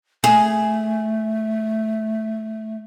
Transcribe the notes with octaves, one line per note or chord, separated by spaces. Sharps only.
A3 G#4